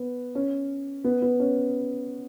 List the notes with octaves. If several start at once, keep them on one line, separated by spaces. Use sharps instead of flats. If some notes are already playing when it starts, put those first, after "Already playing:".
Already playing: B3
C#4
B3
B3
C#4